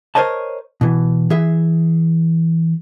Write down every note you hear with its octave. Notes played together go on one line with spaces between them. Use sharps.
A#4 C5 C#5 D#5 A5
B2 E3
E3 G#4 E5